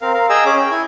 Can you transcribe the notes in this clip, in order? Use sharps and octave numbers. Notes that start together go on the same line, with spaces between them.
C4 A#4 F5
A#4 F5
G#4 D#5 G5 G#5 A#5 E6
C#4 G#4 D6
G5
E4 G#5